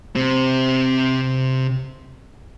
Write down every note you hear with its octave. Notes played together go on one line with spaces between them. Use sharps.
C3 C4